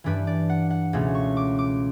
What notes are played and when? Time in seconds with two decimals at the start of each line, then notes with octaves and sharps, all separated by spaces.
0.04 G2 E3 G3 D4 B4
0.27 D5
0.49 F#5
0.70 F#5
0.93 C#2 B2 A3 C#4
1.15 C#6
1.37 D6
1.59 D6